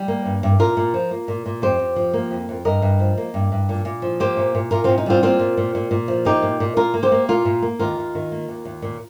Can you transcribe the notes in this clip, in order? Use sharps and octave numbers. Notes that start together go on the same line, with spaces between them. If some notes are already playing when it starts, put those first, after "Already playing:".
Already playing: G3
A#3
G2
G2
A#2 F4 A#4
A#2
F3
A#3
A#2
A#2
F2 G4 C5
F2
F3
A#3
F2
F2
G2 A#4 D#5
G2
F3
A#3
G2
G2
A#2
A#2
F3
A#3 G4 C5
A#2
A#2
A#2 F4 A#4
A#2 C4 F4
D#4
G3 C4 F4
A#3 C4 F4
A#2
A#2
A#2
A#2
F3
A#3 D#4 G4
A#2
A#2
A#2 F4 A#4
A#3
G4 C5
A#3
A#2 F4 A#4
A#2
A#3
D#2 F4 A#4
D#2
D#3
A#3
D#2
D#2
A#2